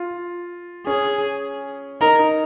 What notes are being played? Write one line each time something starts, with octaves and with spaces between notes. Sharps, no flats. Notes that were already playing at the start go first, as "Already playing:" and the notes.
Already playing: F4
C#4 G#4
D#4 A#4
D#4